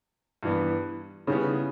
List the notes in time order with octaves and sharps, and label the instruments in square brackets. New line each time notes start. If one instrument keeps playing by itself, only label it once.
[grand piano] G2 E3 B3
[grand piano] C#3 G3 B3 [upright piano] C#4 E4